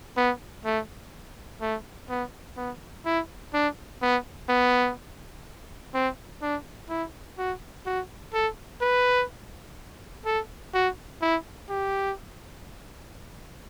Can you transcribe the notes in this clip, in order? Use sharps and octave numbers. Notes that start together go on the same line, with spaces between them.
B3
A3
A3
B3
B3
E4
D4
B3
B3
C4
D4
E4
F#4
F#4
A4
B4
A4
F#4
E4
G4